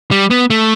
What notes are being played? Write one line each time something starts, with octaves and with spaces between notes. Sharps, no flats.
G3
B3
A3